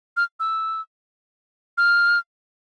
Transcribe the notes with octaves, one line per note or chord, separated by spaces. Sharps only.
F6
E6
F6